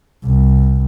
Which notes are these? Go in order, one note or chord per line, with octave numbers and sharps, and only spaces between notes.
C2